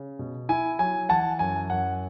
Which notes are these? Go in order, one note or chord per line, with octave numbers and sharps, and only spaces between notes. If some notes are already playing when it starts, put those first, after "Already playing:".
Already playing: C#3
B2
E4 G#5
F#3 G#5
E3 F#5 A5
F#2 G#5
F#2 F#5